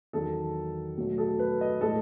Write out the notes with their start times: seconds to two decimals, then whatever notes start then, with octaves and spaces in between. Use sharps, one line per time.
0.13 E2 D#3 F#3 A4
0.97 B2 F#3 A3
1.18 A4
1.39 B4
1.61 D#5
1.81 A2 G#3 A4